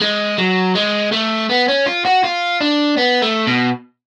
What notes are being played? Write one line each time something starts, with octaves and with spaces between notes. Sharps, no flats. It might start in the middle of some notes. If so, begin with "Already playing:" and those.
G#3
F#3
G#3
A3
B3
C#4
F4
F#4
F4
D4
B3
A3
B2